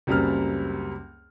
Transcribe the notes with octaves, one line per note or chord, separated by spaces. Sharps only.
C#2 F#2 G3 A#3 C4 F6